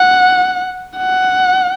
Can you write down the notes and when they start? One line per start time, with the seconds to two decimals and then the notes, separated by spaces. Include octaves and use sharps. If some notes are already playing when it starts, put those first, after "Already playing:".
Already playing: F#5
0.97 F#5